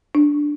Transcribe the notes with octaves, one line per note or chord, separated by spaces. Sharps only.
D4